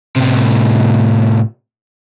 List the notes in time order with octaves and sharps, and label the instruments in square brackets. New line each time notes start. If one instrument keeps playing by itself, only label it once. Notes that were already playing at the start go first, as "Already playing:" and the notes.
[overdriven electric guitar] A2 C3